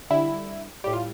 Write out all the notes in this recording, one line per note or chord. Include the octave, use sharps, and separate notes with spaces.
D3 G3 E4
A2 G3 G4
F4